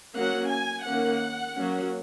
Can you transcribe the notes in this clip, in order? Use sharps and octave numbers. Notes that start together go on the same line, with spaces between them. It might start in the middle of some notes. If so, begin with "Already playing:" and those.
F#3 A#3 C#4 F#5
G#5
D#3 A#3 C#4 F#5
F#3 A#3 C#4